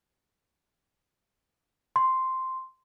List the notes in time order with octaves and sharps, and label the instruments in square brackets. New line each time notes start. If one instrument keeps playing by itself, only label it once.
[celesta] C6